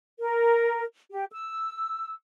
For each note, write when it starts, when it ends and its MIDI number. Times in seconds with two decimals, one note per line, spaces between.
0.19 0.83 70
1.10 1.24 67
1.32 2.12 88